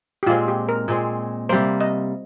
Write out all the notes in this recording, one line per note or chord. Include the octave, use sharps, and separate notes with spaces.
G4
A#2 G#3 C4 F4
G4
A#4
A#2 G#3 C4
C3 G3 A#3 C5
D#5